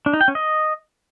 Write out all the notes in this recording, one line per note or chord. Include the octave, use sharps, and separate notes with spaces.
D4
D#4
G5
C#4
D#5